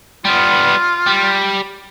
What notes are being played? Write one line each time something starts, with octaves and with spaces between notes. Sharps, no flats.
G3 B3 F4
G3